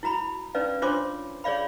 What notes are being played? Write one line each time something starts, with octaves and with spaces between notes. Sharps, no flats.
E4 F#4 A#5 B5
C#4 D#4 B4 D5 F5
D4 F4 C5 C#5 C6 D6
G#4 C#5 D5 F5 B5